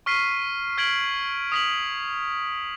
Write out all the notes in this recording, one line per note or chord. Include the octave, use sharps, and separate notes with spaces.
C#6 F6 B6 C7 D#7
F6 G#6 B6 D7 F#7
D#6 B6 F#7